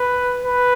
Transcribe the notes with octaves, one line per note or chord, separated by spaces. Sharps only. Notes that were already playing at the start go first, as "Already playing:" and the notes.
Already playing: B4
B4